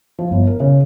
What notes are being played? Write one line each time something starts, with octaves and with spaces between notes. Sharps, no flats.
F3
G1
A#4
C#3